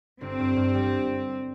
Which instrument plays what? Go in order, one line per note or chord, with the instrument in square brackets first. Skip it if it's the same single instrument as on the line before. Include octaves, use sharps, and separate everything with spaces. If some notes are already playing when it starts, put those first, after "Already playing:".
[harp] G1 [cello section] C4
[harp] G2
G2
G3